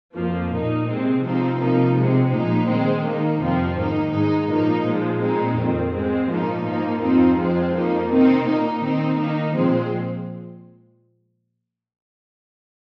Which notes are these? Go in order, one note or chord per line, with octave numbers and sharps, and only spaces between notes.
F2 F3 A#3
A#2 A#3 D#4
C3 G#3 C4
C3 F3 C4 D#4
C3 F3 A#3 D#4
C3 G#3 C4
A#2 F3 G#3 D#4
D#3 G#3 C4
D#3 A#3 D#4
F2 C3 F3 C4
G#2 D#3 A#3 D#4
G#2 G#3 D#4
A#2 F3 A#3 D#4
A#2 F3 G#3
A#2 G#3 C4 D#4
F2 D#3 C4
G#2 G#3 C4
A#2 F3 A#3 D#4
G#2 F3 A#3 D#4
F2 F3 C4 D#4
F2 F3 G#3 C4
F2 F3 A#3 D#4
C3 D#3 C4 D#4
A#2 A#3 D#4
D#3 C4 D#4
D#3 A#3 D#4
A#2 F3 G#3 C4